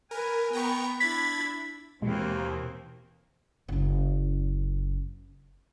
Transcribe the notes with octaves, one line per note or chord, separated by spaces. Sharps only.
A#4 B4 G#5
B3 G5 A#5 C#6
D4 E4 B5 G#6 A6 B6
D#2 B2 E3 G#3 A#3 C4
F#1 C#4